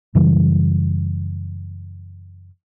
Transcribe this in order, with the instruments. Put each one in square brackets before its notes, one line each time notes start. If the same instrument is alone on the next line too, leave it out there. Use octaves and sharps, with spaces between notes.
[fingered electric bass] F#2 C#3 E3 G3